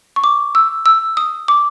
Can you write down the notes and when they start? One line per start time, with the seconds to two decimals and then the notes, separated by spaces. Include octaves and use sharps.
0.16 C#6
0.24 D6
0.55 E6
0.86 E6
1.17 D#6
1.48 D6